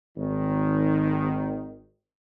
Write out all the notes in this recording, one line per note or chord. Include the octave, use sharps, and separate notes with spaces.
G#1 D#3